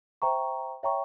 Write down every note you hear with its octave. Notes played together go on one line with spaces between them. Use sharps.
C5 E5 G5 A#5 C#6
C#5 E5 G5 A#5 C#6